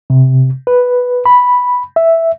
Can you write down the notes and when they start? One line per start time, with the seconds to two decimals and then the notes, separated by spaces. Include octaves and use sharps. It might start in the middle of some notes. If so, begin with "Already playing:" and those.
0.10 C3
0.67 B4
1.26 B5
1.96 E5